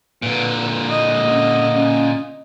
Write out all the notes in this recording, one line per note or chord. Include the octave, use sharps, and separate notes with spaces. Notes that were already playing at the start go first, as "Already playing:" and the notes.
A#2 D3 B4
A#3 D#5
C#4
C#4